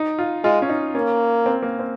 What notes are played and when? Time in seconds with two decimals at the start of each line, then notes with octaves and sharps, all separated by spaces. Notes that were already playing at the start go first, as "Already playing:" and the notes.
Already playing: D#4
0.19 F4
0.44 G#3 F4
0.62 C#4
0.69 D#4
0.95 A#3 C#4
1.46 C4
1.62 A#3
1.79 C4